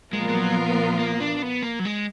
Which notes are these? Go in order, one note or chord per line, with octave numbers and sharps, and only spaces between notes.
A#2 F3 G#3 B3 F4 A#4
G#3
F#3
A#3
D4
B3
A#3
F#3
G#3